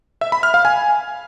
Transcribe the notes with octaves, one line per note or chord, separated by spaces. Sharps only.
E5
B5
F6
F5
G#5